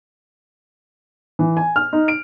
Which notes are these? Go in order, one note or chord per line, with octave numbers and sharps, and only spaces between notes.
E3
G#5
F6
D#4
D7